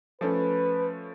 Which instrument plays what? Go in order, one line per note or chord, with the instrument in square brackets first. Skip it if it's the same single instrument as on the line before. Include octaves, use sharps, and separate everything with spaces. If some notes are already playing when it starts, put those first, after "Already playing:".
[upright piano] F3 A3 C#4 [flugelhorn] B4